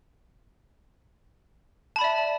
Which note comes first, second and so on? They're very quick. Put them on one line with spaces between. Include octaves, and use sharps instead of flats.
A5 B5 D5 E5